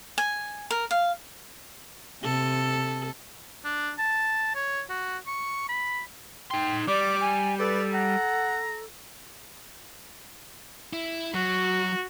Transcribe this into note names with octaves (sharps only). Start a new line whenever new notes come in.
G#5
A#4
F5
C3 A4
D4
A5
C#5
F#4
C#6
B5
D#4 G5 C6
G3 D5 D6
G#5
A4 B4 D5
F#5 A#5
E4
F#3 F#4